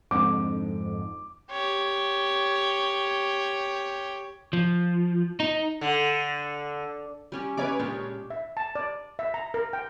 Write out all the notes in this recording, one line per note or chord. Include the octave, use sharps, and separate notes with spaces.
F2 G#2 D3 D6
G4 C#5
F3
D#4
D3
G3 C#4 G4
C#3 B4 C#5 D5 G#5 D6
A#2 G#3 D4 G4
E5
A5
D5
E5
A#5
A#4
G5